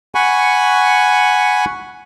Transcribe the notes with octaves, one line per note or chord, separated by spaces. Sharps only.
F#5 G#5 B5 C#6